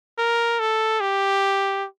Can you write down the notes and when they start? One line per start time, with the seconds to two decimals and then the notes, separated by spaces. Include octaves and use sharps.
0.18 A#4
0.60 A4
1.00 G4